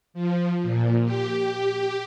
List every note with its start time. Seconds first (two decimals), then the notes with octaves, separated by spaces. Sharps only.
0.14 F3
0.62 A#2
1.05 G4